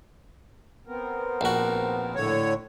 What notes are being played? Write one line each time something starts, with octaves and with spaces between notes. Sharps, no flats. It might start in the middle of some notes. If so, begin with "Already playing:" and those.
B3 C4 A#4
A#1 F#4
A2 D3 C#5